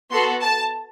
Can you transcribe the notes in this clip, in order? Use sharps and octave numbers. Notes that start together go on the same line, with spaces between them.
B3 F#4 A4 C6
A5